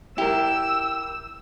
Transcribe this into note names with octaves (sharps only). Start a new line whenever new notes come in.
E4 G4 A#4 E6